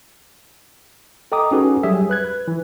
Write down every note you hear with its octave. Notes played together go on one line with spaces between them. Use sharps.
A4 D#5 G5 A#5 D6 D#6
C#4 D#4 F#4 G#4 A4 B4
F#3 G3 G4 G#4 E5
B4 F#6 G#6
B4
E3